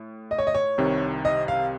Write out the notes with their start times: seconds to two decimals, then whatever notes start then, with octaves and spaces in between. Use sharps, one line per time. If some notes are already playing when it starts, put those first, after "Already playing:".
Already playing: A2
0.31 D#5
0.38 C#5
0.47 D#5
0.54 C#5
0.78 C2 C3 D#3
1.25 D#5
1.48 F5